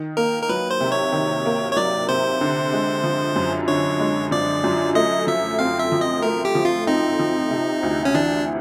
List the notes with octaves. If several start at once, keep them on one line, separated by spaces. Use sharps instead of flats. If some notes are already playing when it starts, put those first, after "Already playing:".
Already playing: D#3
A#3 A#4
A#4
F#3 B4
C5
C3
C#5
D#3
A#3
C#5
F#3 D5
C3 C5
D3
G#3
F3
F#2
D3 C#5
G#3
F3 D5
F#2
A3 D#5
F3 E5
C4 F5
E5
F3
D#5
A3 A#4
G4
F3
F4
C4 D#4
F3
C3
D2
C#4
E3 D4